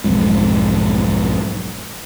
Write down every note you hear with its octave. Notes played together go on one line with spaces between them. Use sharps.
B1 F2 G#2